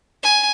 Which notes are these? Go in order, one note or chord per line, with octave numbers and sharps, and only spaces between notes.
G#5